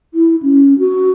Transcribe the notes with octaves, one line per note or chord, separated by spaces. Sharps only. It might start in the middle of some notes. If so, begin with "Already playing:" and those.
E4
C#4
F#4